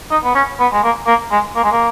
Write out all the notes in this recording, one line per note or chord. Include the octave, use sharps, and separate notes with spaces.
D#4
B3
C#4
B3
G#3
A#3
A#3
G#3
A#3
G#3
A#3